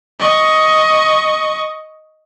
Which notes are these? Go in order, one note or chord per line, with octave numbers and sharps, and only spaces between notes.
D#5 C#6